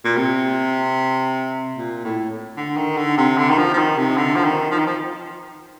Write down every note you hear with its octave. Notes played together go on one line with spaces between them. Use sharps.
A#2
C3
A#2
A2
D3
D#3
D3
C3
D3
D#3
F3
F3
D#3
C3
D3
F3
D#3
F3
D#3
F3